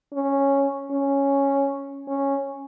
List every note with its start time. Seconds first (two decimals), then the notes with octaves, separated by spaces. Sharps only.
0.13 C#4
0.91 C#4
2.07 C#4